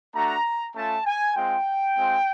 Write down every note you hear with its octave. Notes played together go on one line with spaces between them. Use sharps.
A3 D4 F#4 A#5
A3 C#4 F4 A5
G#5
G#3 C4 F4 G5
G#3 C4 F4